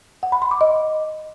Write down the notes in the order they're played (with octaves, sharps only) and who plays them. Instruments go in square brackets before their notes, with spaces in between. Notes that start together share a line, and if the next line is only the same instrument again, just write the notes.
[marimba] F#5
B5
C6
D6
D#5